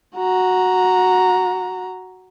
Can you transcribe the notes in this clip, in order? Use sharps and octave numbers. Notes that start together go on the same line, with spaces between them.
F#4 A#5